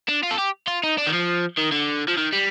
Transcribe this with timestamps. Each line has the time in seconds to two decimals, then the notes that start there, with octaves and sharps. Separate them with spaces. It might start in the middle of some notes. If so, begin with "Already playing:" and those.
0.09 D4
0.23 F4
0.31 A4
0.38 G4
0.68 F4
0.84 D#4
0.98 D4
1.07 D#3
1.13 F3
1.58 D#3
1.72 D3
2.08 F3
2.17 D#3
2.33 G3